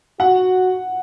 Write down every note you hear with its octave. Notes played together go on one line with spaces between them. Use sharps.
F#4 F#5